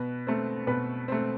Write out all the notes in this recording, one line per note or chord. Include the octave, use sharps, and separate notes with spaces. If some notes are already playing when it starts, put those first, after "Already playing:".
Already playing: B2 B4
A3 C4
B2 B4
A3 C4